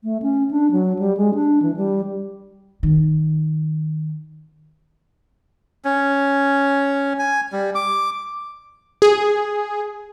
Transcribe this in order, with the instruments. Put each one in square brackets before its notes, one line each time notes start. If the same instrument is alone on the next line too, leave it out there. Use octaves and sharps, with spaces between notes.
[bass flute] A3
C#4
D4
F#3
G3
G#3
D4
E3
G3
[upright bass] D#3
[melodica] C#4
G#5
G3
D6
[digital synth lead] G#4